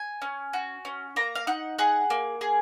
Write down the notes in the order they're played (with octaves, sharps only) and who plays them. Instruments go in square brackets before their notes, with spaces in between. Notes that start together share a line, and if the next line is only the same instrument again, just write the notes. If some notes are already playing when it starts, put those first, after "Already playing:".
Already playing: [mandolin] G#5
C#4
F#4
C#4
A#3 A#5
F5
D#4 F#5
G#4 F#5
A#3
G#4